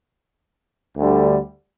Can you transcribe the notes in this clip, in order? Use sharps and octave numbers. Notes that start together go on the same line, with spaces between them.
D2 D3 G3